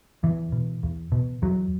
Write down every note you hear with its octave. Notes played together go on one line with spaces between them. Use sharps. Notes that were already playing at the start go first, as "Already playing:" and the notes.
E2 E3
B2
E2
B2
E2 F#3